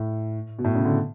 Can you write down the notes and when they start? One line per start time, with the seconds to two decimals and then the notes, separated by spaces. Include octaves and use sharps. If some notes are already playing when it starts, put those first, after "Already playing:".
Already playing: A2
0.59 B2
0.64 A2
0.75 C#3
0.84 D3